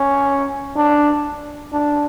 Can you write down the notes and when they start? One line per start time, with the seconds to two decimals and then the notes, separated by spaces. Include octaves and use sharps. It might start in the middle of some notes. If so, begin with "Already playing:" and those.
Already playing: C#4
0.76 D4
1.73 D4